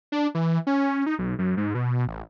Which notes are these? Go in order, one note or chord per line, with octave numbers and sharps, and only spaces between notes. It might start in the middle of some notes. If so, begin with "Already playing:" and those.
D4
E3
C#4
D#4
B1
F#2
G#2
B2
A1